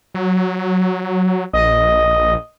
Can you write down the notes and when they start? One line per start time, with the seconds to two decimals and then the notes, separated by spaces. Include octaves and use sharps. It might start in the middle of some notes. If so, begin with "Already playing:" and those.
0.14 F#3
1.53 A#1 D#5